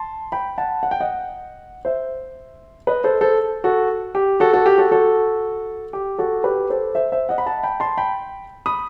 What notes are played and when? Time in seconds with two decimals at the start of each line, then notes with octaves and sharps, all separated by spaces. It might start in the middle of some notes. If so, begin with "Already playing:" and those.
Already playing: A5 C6
0.32 G5 B5
0.58 F#5 A5
0.83 F#5
0.91 G5
1.00 D#5 F#5
1.85 C5 E5
2.87 B4 D#5
3.04 A4 C5
3.21 A4 C5
3.64 F#4 A4
4.15 G4
4.40 F#4 A4
4.53 F#4 A4
4.66 G4
4.78 F#4 A4
4.91 F#4 A4
5.93 G4
6.18 F#4 A4
6.44 G4 B4
6.70 A4 C5
6.95 C5 E5
7.12 C5 E5
7.29 D#5 F#5
7.38 B5
7.46 F#5 A5
7.63 G5 B5
7.80 A5 C6
7.98 G5 B5
8.66 B5 D#6